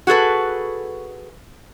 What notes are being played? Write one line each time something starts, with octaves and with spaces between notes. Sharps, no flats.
F#4 G#4 A4 B4